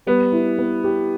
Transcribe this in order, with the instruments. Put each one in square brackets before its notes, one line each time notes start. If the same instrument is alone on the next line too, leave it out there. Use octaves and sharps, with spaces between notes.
[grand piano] G3 [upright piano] B3
[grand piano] E4
B3
G4